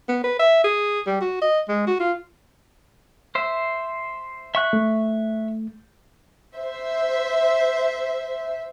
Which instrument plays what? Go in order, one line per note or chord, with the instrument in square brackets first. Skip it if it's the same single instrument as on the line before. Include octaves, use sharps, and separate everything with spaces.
[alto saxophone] B3
B4
E5
G#4
G3
F#4
D#5
G#3
F#4
F4
[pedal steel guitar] C5 E5
E5 C#6 F#6
[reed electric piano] A3
[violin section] C5 E5